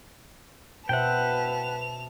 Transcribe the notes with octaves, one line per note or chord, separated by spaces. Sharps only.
B2 B4 C5 E5 F#5 G5 A5 F7